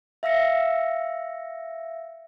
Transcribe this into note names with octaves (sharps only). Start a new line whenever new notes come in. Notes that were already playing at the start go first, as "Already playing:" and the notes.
E5 F5 E6 A#6 C#7